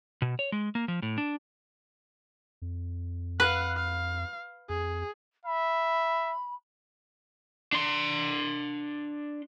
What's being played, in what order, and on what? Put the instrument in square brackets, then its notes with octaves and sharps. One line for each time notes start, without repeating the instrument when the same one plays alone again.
[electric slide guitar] B2
C#5
G#3
A#3
F3
A2
D4
[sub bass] F2
[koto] B4 [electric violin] F5 F#5
[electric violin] F5
[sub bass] F2 [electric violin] G#4
[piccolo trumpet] E5 [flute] B5
[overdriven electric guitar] D4 C6